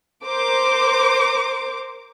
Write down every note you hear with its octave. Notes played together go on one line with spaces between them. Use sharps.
A#4 C5 D6